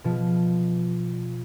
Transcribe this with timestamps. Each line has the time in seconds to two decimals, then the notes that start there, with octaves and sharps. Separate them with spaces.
0.04 B2 F3